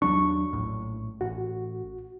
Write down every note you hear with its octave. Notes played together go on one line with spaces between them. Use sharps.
D#2 F#3 D4 C#6
A#1 A2
A1 F#4